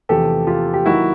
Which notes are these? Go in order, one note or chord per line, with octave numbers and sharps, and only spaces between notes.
E2 C3 F3 A3 G4 A4
F4 G4
G4
D#3 F#3 A#3 D#4 E4 F#4